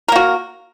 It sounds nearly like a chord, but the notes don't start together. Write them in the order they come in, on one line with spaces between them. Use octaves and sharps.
A#4 A#3 F#4